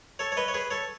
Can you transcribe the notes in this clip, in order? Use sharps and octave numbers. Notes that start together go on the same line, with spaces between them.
A4 C#5
C#5
B4 D#5
C#5
G#4 B4
A4 C#5